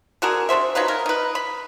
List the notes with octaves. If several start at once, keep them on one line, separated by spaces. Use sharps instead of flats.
D3 F#4 G#4 A#4
D4 F#4 C5 E5
F#3 D#4 F4 B4
A#4
D#4 B4
B5